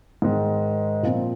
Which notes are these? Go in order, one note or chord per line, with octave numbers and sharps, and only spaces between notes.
G#2 D#3 G#3
A#2 F3 C4